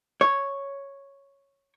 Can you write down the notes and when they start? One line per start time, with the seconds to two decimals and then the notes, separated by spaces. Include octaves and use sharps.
0.21 C#5